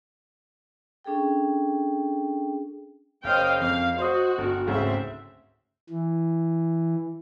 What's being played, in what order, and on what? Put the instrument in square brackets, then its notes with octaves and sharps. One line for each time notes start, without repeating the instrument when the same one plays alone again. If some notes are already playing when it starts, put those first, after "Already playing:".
[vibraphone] C#4 D4 G#4 A4 G5
[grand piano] F#1 C#4 C5 [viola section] D#5 F5 G5
[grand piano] F2 [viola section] F5
[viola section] F#4 [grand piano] C5 D#5 D#6
[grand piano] G1
[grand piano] D2 G#2 C#3 [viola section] C4 E5
[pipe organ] E3